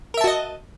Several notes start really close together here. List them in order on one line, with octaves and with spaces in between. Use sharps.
A#4 E5 A5 F#4 D#5